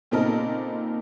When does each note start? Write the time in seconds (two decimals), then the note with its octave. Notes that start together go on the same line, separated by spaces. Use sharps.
0.11 A#2 C#3 C4 D#4 A4 A#4